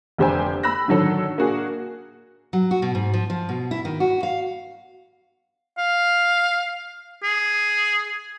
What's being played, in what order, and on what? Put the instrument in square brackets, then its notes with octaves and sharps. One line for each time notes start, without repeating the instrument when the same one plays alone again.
[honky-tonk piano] F1 D3 G4 C5 G5 G#5
B5 E6 F#6 A#6
D3 D#3 F#3 A4
A#3 D4 F#4 G#4
[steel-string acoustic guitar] F#3
F#4
B2
G#2
F3
F3
B2
E4
D#3
F#4
F5
[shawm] F5
G#4